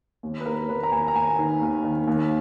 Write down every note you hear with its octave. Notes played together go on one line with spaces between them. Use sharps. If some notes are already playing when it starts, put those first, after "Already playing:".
D#2
B4
D#2 A#4
D#2 B4
A#5
D#2 G#5
A#5
D#2 G#5
D#3
D#2
D#3
D#2